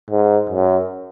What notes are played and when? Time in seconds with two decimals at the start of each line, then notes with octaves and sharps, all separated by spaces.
0.11 G#2
0.49 F#2